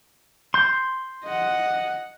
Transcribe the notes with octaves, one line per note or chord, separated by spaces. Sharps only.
C6 G6
D#5 F#5